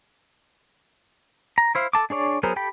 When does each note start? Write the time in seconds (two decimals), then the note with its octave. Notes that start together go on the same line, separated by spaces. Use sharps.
1.58 A#5
1.75 E4 C5 F5
1.93 A4 A5 D6
2.10 D4 G#4 C#5 D5
2.43 F#3 B3 G#4 A#4 C5
2.56 G4 A4 G5 B5